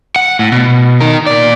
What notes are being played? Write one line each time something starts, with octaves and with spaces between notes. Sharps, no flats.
F#5
A2
B2
D#4 A#4
A#2 D5